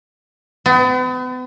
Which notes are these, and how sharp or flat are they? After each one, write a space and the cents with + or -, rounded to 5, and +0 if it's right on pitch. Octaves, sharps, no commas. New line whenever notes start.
B3 +40